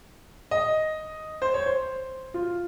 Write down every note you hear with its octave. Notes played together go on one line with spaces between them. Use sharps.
D#5
C5
C#5
C5
F4